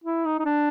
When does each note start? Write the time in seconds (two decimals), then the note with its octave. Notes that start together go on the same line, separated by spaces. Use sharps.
0.04 E4
0.25 D#4
0.39 D#4
0.45 D4